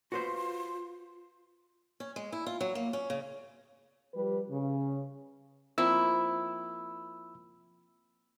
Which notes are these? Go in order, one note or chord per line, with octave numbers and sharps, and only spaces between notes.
F4 F#4 B4 C5 C6
C#4
G#3
E4
F4
F#3
A#3
C#4
C#3
F3 G3 G4 B4
C#3
F3 A#3 C4 E4 E6